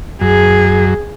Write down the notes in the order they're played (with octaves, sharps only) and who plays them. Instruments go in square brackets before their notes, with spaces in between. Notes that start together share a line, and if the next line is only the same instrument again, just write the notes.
[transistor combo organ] F#2 [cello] G#4